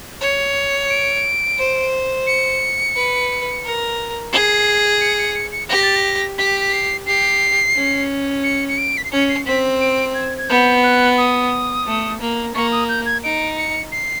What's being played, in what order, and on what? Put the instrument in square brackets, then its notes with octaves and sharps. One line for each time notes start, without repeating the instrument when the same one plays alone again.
[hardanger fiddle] C#5
[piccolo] D7
[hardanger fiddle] C5
[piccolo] C#7
[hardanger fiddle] B4
A#4
[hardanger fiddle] G#4 [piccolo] C7
[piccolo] C#7
C#7
C#7
C#7
[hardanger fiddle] G4 [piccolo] A#6
[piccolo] A6
A#6
[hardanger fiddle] G4 [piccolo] B6
[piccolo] B6
C7
[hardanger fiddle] G4 [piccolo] C7
[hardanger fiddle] C#4
[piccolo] C#7
C#7
D7
B6
C7
[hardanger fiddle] C#4 [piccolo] C#7
[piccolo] C7
[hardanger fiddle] C4 [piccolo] B6
[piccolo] D7
G#6
G#6
[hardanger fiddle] B3 [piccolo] G6
[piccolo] F#6
D#6
[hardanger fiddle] A3
A#3
[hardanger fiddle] A#3 [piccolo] C#6
[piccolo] D#6
G6
G#6
[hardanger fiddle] D#4 [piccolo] D7
[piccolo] C#7
C7